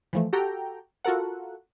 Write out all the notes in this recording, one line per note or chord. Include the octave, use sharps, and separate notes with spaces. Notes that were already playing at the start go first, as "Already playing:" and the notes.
E3 F3 A3
F#4 G4 A4 G5 A#5
F4 F#4 A4 A#4 F#5